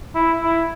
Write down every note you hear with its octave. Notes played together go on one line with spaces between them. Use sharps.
E4
E4